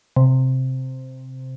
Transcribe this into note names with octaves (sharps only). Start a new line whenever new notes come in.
C3